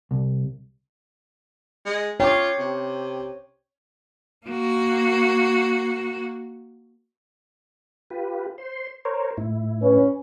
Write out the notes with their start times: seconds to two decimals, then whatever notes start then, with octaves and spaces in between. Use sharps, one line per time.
0.11 C2
1.86 G#3
2.20 F4 C#5 G5 D6
2.59 C3
4.46 A#3 F#4
8.10 F4 G4 B4
8.58 C5 C6
9.05 A#4 C5 C#5
9.37 A2 E4
9.82 C#4 B4